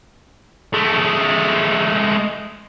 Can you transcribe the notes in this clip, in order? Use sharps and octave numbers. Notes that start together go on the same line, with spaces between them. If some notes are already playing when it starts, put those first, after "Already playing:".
G#3 A3